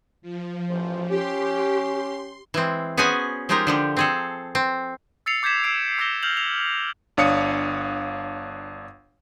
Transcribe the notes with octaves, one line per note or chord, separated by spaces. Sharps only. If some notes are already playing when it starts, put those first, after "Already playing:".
F3
A1 C5
C#4 G4 C6
E3 G#3 C4
B3 C#4 F#4 G#4 C5 G#5
F3 G#3 D#4 F4 G4 A#4
D3 F3 G4
C4 G#4 A4
C4
E6 A6 C7 C#7 F7
D6 G6 G#6 B6 E7
E6 C7 D7
D6 E6 G6 A#6 G7
F6 G6 F7 F#7
F7
G1 D4 C#5 F5 D#6 C#7